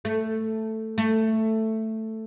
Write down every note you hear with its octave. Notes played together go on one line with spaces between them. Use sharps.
A3
A3